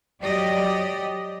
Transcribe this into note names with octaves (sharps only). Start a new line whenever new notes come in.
F#3 G4 D5 D#5